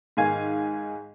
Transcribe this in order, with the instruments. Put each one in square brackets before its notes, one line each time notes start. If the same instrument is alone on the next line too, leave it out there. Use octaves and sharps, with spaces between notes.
[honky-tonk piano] G#2 D#3 F5 G#5 G#6